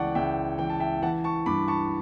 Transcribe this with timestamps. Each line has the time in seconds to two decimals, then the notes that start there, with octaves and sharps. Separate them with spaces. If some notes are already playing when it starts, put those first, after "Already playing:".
Already playing: C#2 E3 D5 F#5 G5 A5 C#6
0.15 C#2 E5 G5
0.58 E3 G5
0.70 A5
0.80 E5 G5
1.03 E3 F#5 A5
1.24 A5 C#6
1.46 G2 B5 D6
1.68 A5 C#6